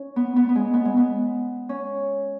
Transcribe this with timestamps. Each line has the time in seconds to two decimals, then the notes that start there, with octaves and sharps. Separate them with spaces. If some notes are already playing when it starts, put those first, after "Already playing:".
Already playing: C#4
0.16 B3
0.36 B3
0.49 B3
0.56 G#3
0.74 B3
0.85 G#3
0.97 B3
1.69 C#4